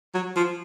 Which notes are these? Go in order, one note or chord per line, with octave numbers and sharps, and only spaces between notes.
F#3
F3